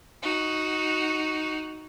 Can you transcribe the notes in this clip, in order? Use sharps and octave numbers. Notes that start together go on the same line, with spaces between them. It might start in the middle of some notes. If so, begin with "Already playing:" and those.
D#4 F#4